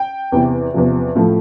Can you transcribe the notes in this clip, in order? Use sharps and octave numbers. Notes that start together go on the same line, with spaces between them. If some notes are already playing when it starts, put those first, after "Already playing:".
Already playing: G5
E2 C3 E3
E2 C3 F3
A2 F3 A3